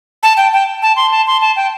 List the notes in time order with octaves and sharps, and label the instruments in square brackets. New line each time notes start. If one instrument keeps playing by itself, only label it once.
[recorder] A5
G5
G5
A5
C6
A5
C6
A5
G5